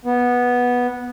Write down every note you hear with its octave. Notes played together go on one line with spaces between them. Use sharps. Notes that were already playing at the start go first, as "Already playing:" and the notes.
B3